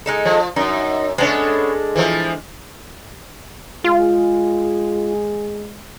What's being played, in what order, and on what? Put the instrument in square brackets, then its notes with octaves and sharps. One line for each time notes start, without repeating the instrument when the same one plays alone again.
[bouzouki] G#3 D#4 A4
[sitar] F3
[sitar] F#2 [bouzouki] D#4
[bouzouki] G#3 D4 A4 [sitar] B3 C#4
[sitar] E3 F3
[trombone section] G#3 G#4 [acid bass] F4